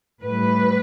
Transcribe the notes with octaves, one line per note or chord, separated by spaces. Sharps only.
A2 G3 B4